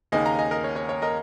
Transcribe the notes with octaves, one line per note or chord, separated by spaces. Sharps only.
D#2 C#3 A#3 D#4 D#5 G#5
F5 A#5
D#5 G#5
A#4 D#5
C#5
C#5
C#5
A#4 D#5